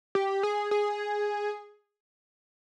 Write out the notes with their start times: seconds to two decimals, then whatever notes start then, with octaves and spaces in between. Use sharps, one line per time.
0.15 G4
0.43 G#4
0.71 G#4